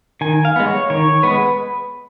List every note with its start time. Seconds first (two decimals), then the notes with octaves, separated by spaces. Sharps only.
0.21 D#3 G#5
0.45 F5
0.56 G#3 B3
0.67 C#5
0.90 D#3 C#5
1.23 G#3 B3 B4